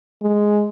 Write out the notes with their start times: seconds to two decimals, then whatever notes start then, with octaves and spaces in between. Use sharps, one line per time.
0.22 G#3